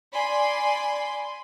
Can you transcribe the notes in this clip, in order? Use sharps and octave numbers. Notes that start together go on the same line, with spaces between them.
D5 G#5 B5 C6